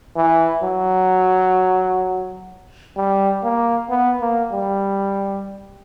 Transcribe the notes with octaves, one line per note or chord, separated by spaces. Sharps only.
E3
F#3
G3
A#3
B3
A#3
G3